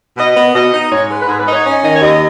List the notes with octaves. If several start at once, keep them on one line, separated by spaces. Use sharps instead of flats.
B2 D#5
B3
B2 D#5
D#4
G#2 C#5
G#3 B4
B4
G#2 G#4
B4
D#4
C#5
C#4 D#5
D#3 D#5
C#5
D#2 D#5